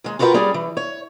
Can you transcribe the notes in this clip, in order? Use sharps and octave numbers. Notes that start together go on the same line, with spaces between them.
D#2 G#3
F4 F#4 A#4 B4 E5 G5
G3 C#4 G#4 D5
E3
C#5